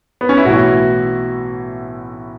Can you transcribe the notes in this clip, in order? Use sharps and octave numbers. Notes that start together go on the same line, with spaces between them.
B3
C#4
E4
B1 A2 E3 F#4